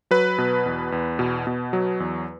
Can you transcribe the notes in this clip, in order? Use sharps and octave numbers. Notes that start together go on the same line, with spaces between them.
F#3 B4
B2
E2
E2
B2
B2
F#3
E2